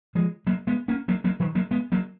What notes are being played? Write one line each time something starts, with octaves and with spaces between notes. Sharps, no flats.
F3 G#3
F#3 A#3
G#3 B3
A#3 C#4
F#3 A#3
F#3 A#3
D#3 F#3
F#3 A#3
G#3 B3
F#3 A#3